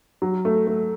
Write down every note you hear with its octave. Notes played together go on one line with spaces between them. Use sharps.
F#3
A3
A3